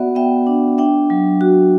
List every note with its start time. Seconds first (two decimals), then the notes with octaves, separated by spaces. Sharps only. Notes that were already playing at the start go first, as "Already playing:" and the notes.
Already playing: B3 F#4 D5 E5 F#5
0.15 B3 E5 G5
0.47 D4
0.78 D4 E5 G5
1.10 F#3
1.41 F#4